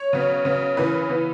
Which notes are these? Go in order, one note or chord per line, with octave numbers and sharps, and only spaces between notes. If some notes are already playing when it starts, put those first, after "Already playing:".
Already playing: C#5
C#3 F#3 B3
C#3 F#3 B3
C#3 E3 A#3 B4
E3 B3